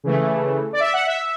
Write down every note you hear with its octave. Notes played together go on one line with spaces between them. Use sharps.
C#3 E3 A3
D5
E5
F#5
E5